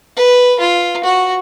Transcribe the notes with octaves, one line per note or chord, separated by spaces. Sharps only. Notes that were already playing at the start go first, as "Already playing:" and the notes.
B4
F4
F#4